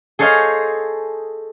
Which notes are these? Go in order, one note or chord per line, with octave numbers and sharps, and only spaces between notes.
G#4 A4 C5 C#5 D#5 F5